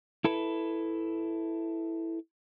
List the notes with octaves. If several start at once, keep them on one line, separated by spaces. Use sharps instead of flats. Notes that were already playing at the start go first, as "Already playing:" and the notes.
E4 A4 B4